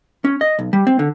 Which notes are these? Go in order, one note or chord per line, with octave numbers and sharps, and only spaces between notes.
C#4
D#5
B1
G3
C4
D3